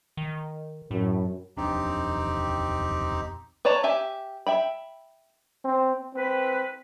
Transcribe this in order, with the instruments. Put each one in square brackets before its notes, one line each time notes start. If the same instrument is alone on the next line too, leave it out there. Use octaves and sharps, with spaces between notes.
[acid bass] D#3
[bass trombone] F#2 [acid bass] A2
[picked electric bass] D#1 F2 D4 [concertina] C4 D#4 G4
[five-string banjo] B4 C#5 D5 A5 A#5
G4 E5 G#5
E5 G5 B5
[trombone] C4
[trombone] C4 [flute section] B4